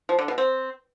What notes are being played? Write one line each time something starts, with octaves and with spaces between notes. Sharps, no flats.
F3
D3
B2
C4